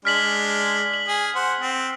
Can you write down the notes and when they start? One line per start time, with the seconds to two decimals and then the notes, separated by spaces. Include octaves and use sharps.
0.05 G#3 D4 F6 B6 F#7
0.94 F#7
1.08 G#4
1.35 C5 F#5
1.60 C4